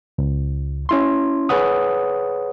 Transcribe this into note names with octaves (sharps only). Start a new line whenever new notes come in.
C#2
C#4 E4 C6
G#4 B4 C#5 F#5 D#6